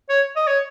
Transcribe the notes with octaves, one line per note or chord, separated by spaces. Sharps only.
C#5
D#5
C#5